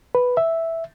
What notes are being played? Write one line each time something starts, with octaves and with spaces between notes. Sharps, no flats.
B4
E5